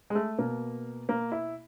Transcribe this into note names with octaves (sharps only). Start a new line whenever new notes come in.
G#3
A3
B2 A#3
A#3
E4